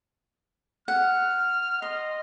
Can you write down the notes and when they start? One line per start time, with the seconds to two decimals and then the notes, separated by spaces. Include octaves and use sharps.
0.88 F#5 F6
1.82 D#5 C6